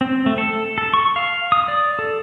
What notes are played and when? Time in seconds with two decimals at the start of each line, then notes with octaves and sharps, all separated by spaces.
0.01 C4
0.26 A3
0.38 A4
0.78 A4
0.94 C#6
1.16 F5
1.52 D#6
1.68 D5
1.99 A4